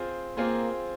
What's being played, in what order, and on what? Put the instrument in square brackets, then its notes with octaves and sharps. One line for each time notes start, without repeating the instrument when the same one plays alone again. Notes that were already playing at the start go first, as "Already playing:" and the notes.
Already playing: [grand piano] C4 F4 G#4 C5
[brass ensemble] A#3 [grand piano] C4 F4 G#4 C5